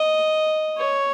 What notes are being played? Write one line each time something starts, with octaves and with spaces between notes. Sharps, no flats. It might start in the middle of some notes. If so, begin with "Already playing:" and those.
Already playing: D#5
C#5